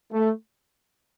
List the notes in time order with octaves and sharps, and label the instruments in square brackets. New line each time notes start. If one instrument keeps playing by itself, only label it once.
[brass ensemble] A3